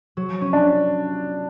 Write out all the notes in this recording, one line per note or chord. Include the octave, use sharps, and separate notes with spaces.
F#3
C#4
D4